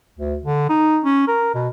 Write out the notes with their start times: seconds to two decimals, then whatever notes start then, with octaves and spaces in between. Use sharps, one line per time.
0.19 D2
0.45 D3
0.69 D#4
1.05 C#4
1.28 A#4
1.55 B2